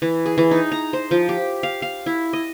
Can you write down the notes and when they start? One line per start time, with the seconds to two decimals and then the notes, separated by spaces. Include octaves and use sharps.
0.02 E3
0.26 G#4
0.38 E3
0.51 D#4
0.72 A#5
0.93 C5
1.11 F3
1.29 G4
1.63 F5
1.82 F5
2.06 E4
2.33 D#5